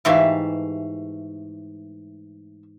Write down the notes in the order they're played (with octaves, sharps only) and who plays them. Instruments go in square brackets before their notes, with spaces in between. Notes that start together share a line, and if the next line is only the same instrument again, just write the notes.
[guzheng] G#2 E3 G4 [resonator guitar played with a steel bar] A3 E5 F5